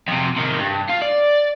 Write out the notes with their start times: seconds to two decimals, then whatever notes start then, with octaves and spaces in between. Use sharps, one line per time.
0.08 F2 C3
0.37 C3 D#3
0.59 G2
0.90 F4
1.02 D5